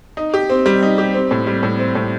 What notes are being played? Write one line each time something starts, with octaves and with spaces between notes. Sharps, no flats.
D#4
G4
C4
G3
D#4
G4
C4
A2
G3
A2
C4
A2